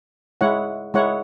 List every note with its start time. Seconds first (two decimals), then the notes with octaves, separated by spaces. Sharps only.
0.41 G#3 E4 C#5 F#5
0.94 G#3 E4 C#5 F#5